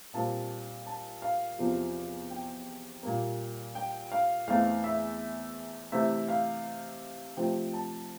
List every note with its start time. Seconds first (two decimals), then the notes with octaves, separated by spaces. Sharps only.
0.14 A#2 G3 C4 A5
0.86 A5
1.22 F5
1.59 E2 C3 F3 C4
2.30 G5
3.03 A#2 G3 A#3
3.75 G5
4.12 F5
4.48 E2 E3 A3 C4 F5
4.84 E5
5.92 C3 E3 A3 C4 E5
6.28 F5
7.37 C3 F3 A3 C4 G5
7.73 A5